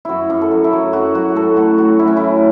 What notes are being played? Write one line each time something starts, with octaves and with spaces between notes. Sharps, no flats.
F#2 E4 F#4
F#2
A4
F#3
E4
F#3 F#4
F#2 F#4
F#3 F#4
A2 A4
F#3 F#4
A2 F#4
A2 E4
C#4
F#3 E4